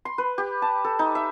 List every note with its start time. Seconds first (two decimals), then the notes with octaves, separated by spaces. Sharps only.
0.05 C6
0.18 B4
0.38 G4
0.62 A5
0.84 A4
0.99 D#4
1.15 E5